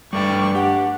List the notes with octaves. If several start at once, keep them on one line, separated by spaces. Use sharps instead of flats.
G2 G3 A3 D5 G5 C#6
D4 G4 F#5